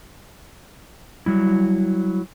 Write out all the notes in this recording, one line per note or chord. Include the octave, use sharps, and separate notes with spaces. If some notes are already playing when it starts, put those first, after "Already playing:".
F#3 G3 E4